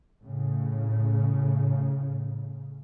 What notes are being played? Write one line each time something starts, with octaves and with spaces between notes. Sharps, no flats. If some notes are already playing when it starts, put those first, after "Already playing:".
A2 C#3